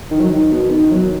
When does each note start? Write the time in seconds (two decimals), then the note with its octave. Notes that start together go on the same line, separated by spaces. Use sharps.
0.11 D#3
0.20 F#3
0.29 D#3
0.51 B2
0.71 D#3
0.91 F#3